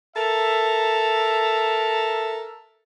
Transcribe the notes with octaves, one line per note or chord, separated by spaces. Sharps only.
A4 A#4 E5 A#5